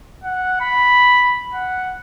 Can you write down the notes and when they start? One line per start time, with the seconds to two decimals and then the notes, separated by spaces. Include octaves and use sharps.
0.24 F#5
0.61 B5
1.54 F#5